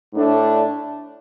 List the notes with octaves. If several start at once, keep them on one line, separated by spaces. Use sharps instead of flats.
A2 A3 D4 A4